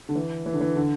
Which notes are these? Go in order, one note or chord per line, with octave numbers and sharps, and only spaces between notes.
D3
E3
E3
D3
E3
D3